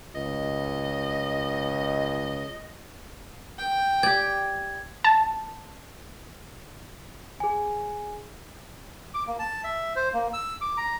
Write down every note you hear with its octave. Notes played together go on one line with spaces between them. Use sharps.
C#2 D#5
G5
G4 D5 G#6
A5
G#4 G#5
D6
A#3
A5
E5
C5
A#3
E6
D6
A#5